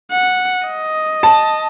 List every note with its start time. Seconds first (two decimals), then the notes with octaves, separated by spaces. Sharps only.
0.11 F#5
0.67 D#5
1.23 A5